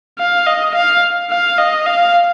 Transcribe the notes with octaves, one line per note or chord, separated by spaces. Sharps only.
F5
D#5
F5
F5
D#5
F5